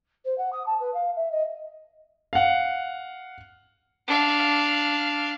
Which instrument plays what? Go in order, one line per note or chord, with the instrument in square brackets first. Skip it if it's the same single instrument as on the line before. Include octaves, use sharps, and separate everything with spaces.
[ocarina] C5
F#5
D#6
A5
B4
F5
E5
D#5
[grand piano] F5 F#5
[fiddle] D4 F5